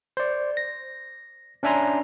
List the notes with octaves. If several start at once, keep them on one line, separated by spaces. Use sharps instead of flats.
C5 D5
A#6
C#4 D4 E5 G#5 A#5 C6